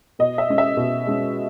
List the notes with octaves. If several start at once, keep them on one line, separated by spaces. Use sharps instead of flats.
B2 D#5
E5
G#3 C#4
E5
B2
G#3 C#4